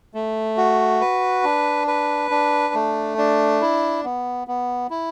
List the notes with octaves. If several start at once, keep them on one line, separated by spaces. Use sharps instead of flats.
A3
F#4
B4
D4
B4
D4
A3
D4
E4
B3
B3
E4